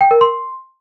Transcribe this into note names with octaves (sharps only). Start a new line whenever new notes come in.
G5
A#4
C6